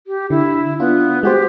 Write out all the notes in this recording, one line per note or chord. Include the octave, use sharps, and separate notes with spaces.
G4
D3 E4
B3 D4 F4
G#3 F#4 G4 C5